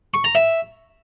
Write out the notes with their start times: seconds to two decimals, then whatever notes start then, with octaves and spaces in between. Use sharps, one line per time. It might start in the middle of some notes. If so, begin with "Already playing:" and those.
0.14 C#6
0.24 A#5
0.35 E5